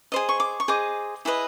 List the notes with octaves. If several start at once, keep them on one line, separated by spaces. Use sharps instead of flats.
G#4 C5 D#5
C#6
D6
C#6
G#4 C5 D#5 D6
E4 G#4 B4 D#5